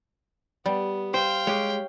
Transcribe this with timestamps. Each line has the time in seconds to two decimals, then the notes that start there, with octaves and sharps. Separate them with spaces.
0.66 G3 B3
1.14 C5 F5 G5
1.47 G#3 G4 C#5